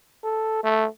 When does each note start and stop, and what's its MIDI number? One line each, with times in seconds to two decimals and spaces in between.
0.24 0.61 69
0.64 0.86 57